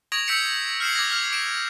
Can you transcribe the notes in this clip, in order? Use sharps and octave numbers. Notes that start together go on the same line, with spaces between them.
C#6 D#6 G#6 A#6 D7 F7
E6 G6 B6 C#7 D7 E7
F6 G6 C7 C#7 E7 F#7
D6 G#6 A#6
F6
D6 D7 E7